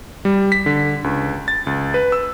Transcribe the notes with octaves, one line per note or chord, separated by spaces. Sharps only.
G3
B6
D3
C#2
A6
C#2
B4
E6